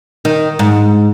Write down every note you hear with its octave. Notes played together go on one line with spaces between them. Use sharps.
D#3
G#2